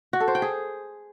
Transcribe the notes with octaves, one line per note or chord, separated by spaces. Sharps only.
F#4
A4
C5
G5
G#4